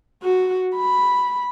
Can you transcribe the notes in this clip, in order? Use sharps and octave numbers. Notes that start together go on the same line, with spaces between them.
F#4
B5